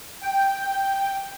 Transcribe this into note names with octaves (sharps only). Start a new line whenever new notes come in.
G5